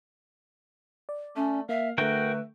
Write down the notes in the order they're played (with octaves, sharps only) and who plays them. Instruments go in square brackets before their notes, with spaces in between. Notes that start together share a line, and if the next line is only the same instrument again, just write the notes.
[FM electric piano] D5
[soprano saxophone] A3 [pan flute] C#4
[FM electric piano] A#3 [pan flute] E5 [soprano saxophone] F5
[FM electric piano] D3 A3 [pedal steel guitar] F#4 A#4 G5 [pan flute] B4 [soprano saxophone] E5